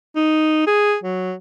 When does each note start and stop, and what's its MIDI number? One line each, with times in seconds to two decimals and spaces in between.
0.16 0.64 63
0.67 0.96 68
1.04 1.33 54